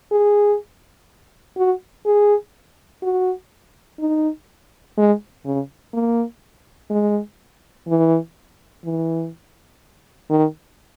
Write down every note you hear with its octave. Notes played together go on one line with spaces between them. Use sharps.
G#4
F#4
G#4
F#4
D#4
G#3
C#3
A#3
G#3
E3
E3
D#3